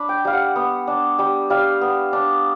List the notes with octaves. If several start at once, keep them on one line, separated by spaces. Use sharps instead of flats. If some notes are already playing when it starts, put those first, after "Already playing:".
Already playing: D4 B5
G5
G3 F5
F#5
B3
D4
G3
G3 F5
B3
D4